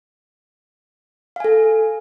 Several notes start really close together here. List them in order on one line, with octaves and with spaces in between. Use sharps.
F5 G#5 A4